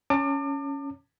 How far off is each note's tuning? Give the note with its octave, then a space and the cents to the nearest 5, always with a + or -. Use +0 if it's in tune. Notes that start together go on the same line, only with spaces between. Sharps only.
C#4 +5 A5 +40 D6 +30